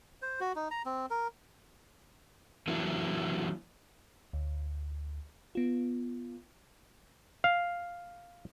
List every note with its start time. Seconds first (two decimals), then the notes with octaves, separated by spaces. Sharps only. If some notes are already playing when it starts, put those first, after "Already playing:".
0.22 C5
0.40 F#4
0.56 D#4
0.71 A#5
0.86 C4
1.10 A#4
2.68 E3 F#3 A#3 D4 E4
4.33 D2
5.55 B3 F4
7.44 F5